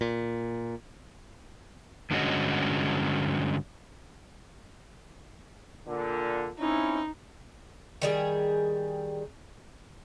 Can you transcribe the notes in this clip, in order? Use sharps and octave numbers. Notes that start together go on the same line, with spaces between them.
A#2
G2 D3 G#3 C#4 F#4 D#5
A#2 D3
C4 C#4 D#4 E4
D#3 G3 G#4